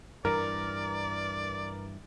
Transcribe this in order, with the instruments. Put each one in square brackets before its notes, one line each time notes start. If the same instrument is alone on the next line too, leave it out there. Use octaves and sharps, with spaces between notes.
[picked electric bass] G2 E3 [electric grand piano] A#4 [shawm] D5